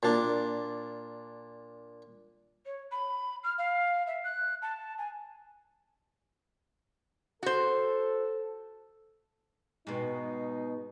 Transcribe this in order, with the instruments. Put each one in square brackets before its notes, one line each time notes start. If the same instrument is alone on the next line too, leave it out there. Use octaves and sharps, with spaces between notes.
[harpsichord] A#2 D4
[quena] C#5
B5
F6
F5
E5
F#6
A5
G#5
[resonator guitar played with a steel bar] F#4 C5 [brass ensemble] A4
[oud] G#2 B2 [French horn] D#4